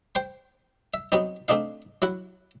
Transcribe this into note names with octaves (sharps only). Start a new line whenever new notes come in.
C5 G5 C6
E5
F#3 B3 C4 D#4
A3 C4 D4 D#4 F5
F#3 E4 F#5